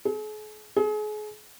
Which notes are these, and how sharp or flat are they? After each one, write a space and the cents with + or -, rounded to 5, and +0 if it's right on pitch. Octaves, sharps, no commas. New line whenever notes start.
G#4 +45
G#4 +35